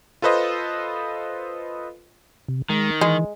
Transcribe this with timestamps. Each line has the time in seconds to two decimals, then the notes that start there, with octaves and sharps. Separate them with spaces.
0.22 F4 A4 B4 C5 D#5
2.48 C3
2.70 D#3 G#3
3.01 E3 G#3